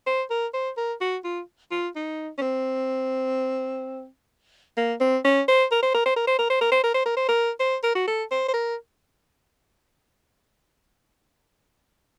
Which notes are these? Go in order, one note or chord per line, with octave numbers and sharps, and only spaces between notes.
C5
A#4
C5
A#4
F#4
F4
F4
D#4
C#4
C4
A#3
C4
C#4
C5
A#4
C5
A#4
C5
A#4
C5
A#4
C5
A#4
C5
A#4
C5
A#4
C5
A#4
C5
A#4
F#4
A4
C5
C5
A#4